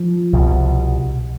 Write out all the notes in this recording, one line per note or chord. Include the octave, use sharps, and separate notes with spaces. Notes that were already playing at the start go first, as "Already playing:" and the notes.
Already playing: F3
C2 B2